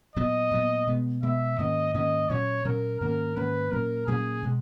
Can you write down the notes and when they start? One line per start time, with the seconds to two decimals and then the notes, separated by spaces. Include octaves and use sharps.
0.16 A#2 F#3 B3 D#5
0.51 A#2 F#3 B3
0.87 B2 G#3 B3
1.23 B2 G#3 B3 E5
1.58 G#2 D#3 A#3 C#4 D#5
1.94 G#2 D#3 A#3 C#4 D#5
2.29 A#2 F#3 C#4 C#5
2.65 A#2 F#3 C#4 A#4
3.01 G#2 D#3 A#3 C#4 A#4
3.36 G#2 D#3 A#3 C#4 B4
3.71 A#2 F#3 A#3 C#4 A#4
4.07 A#2 F#3 A#3 C#4 G#4
4.43 B2 G#3